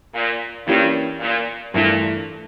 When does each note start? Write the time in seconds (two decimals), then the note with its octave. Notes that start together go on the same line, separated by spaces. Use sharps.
0.14 A#2
0.67 G2 E3 A#3 C#4 G4
1.20 A#2
1.74 G2 A#2 E3 A3 E4